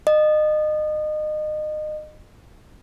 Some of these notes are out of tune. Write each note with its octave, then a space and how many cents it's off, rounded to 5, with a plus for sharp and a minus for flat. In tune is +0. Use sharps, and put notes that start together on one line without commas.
D#5 -30